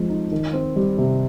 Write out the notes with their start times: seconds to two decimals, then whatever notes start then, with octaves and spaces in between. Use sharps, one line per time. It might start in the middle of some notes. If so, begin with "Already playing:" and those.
Already playing: F3 G#3 C4
0.09 D#4
0.31 D#3
0.53 C4
0.76 G3
0.98 C3